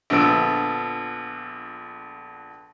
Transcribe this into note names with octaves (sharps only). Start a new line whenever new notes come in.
A#1 D3 F3 B3 E6 D7